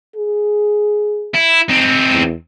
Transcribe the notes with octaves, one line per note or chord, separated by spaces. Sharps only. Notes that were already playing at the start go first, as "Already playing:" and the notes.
G#4
E4
C4 D#4
E2